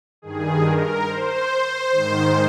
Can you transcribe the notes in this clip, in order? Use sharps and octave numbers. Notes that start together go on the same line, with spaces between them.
G2 D#3 G#4
A#4
C5
G#2 D#3